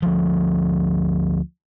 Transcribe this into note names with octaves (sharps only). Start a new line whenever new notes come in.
D2 F3